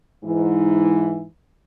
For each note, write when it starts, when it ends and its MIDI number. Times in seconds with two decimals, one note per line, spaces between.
0.24 1.23 44
0.24 1.23 52